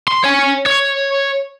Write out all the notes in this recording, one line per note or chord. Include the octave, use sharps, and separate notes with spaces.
C6
C#5 G#5
C#5